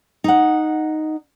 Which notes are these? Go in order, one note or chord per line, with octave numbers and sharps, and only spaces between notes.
D#4 F#5